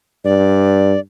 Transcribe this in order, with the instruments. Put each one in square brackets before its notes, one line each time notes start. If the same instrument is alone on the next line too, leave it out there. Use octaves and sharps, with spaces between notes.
[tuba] G2 [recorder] D5